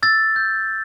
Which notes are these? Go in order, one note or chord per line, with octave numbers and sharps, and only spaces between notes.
E6 A6
G6